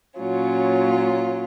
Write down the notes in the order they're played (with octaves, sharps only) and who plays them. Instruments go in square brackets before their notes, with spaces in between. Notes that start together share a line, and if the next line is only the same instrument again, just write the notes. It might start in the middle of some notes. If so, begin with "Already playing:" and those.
[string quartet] A#2 F#3 C#4 F4